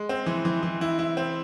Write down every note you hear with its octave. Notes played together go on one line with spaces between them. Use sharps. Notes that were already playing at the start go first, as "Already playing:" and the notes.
Already playing: G#3
C4
E3
E3
E3
E4
E4
C4